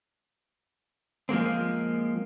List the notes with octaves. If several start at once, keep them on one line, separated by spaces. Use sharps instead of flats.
F3 G#3 A#3 C4